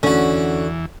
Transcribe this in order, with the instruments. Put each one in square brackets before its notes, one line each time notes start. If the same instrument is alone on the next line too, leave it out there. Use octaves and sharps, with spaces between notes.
[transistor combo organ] E2 E3 [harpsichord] D3 F#4 [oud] C#4